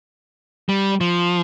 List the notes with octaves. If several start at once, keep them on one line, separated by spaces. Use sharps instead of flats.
G3
F3